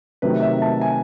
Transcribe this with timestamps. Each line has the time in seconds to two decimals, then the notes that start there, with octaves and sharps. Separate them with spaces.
0.22 C3 D#3 F#3 A3 B4
0.43 E5
0.62 A5
0.81 G#5